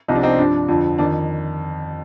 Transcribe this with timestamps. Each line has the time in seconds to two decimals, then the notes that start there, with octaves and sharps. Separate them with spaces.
0.08 C2 C3 F3 D#4
0.15 D4
0.23 C4 D#4
0.38 G2 F3 D4
0.68 F2 D3 F3
0.98 F2 D#3 D4